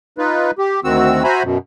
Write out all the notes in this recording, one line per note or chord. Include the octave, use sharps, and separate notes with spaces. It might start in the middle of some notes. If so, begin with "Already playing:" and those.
D#4 F4 B4
G4
D2 D#3 C4 F#4 E6
F#4 C5 E5 G#5 A#5 B5
F#2 B2